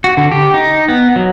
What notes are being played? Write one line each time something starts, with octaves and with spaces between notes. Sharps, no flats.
F#4
D3
G4
D#4
B3
F#3